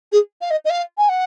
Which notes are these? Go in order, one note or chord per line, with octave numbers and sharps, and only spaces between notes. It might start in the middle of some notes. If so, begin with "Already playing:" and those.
G#4
F5
D#5
D#5
F5
G#5
F#5